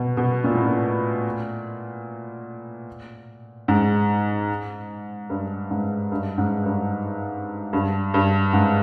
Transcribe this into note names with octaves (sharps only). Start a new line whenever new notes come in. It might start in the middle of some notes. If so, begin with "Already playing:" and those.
Already playing: B2
B2
A#2
A2
A#2
G#2
G2
G#2
G2
G#2
G2
G2
G2
G#2